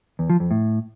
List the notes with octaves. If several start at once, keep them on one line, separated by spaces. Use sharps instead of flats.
E2
F3
F2
A2